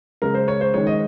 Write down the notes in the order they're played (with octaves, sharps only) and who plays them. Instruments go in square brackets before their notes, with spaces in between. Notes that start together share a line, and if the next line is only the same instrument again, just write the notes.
[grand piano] C#3 G#3 A#4
C5
C#5
C5
D#3 G#3 C#5
D#5